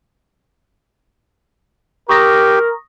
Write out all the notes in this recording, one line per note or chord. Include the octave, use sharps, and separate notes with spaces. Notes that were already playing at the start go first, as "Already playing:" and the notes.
G4 A#4 C#6 D#6 A#6